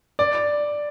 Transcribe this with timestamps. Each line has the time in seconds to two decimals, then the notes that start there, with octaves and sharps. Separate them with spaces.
0.19 D5